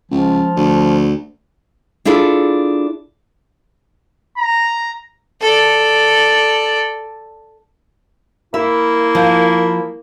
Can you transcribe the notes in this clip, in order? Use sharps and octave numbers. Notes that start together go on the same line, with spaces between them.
C#2 F3
D2
D4 E4 F4 G#4 A4
A#5
A4 D5
A#3 E4 E5
F3